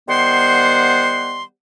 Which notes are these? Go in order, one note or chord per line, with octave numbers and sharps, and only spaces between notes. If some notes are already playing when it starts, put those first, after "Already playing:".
D#3 G3 B3 C5 F#5 C6